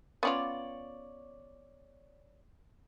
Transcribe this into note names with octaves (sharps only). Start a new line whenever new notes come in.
B3 C#4 F4 C#5 D5